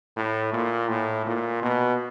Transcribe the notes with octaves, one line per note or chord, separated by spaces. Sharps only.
A2
A#2
A2
A#2
B2